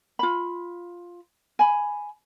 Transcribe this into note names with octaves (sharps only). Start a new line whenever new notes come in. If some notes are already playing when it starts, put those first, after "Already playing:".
F4 B5
G#5 B5